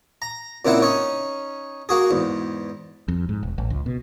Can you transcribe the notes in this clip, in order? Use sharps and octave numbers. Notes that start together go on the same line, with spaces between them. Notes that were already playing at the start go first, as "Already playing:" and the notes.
A#5
A#2 C#3 A#3 C4 E4 F#5
C#4 D#4 C#5
A#3 F#4 G#4
E2 G#2
F2
G#2
E1
A1
C#2
B2